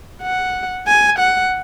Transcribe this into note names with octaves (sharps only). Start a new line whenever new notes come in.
F#5
G#5
F#5